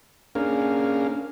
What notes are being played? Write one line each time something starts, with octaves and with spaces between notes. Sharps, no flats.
A#3 C#4 D4 G#4 A#4 F5